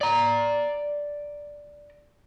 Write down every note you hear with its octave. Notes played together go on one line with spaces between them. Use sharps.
D5 A#5